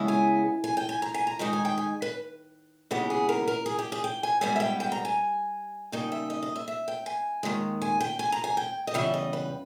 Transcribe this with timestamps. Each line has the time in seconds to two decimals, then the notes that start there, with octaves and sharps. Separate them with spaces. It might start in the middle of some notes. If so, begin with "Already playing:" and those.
Already playing: C#3 G#3 B3 E4
0.08 G#5
0.64 G#5
0.77 G5
0.89 G#5
1.02 A#5
1.14 G#5
1.27 A#5
1.39 D#3 G#3 D#4 A#5
1.53 G#5
1.65 G5
1.77 G#5
2.02 B4
2.91 D#2 C#3 E3 G#3 B3 G4
3.10 G#4
3.29 A#4
3.47 A#4
3.66 G#4
3.78 G4
3.92 G#4
4.04 G5
4.23 G#5
4.41 G#2 G3 B3 G#5
4.56 E5
4.60 G5
4.80 G5
4.92 A#5
5.05 G#5
5.92 C#3 G3 A#3 D#4 G5
6.12 E5
6.30 D#5
6.43 D#5
6.56 E5
6.68 E5
6.88 G5
7.06 G#5
7.43 D#2 D#3 G#3
7.82 G#5
8.00 G5
8.19 G#5
8.32 A#5
8.44 G#5
8.57 G5
8.87 D#5
8.94 E2 C#3 G3 E5
9.14 D#5
9.33 B4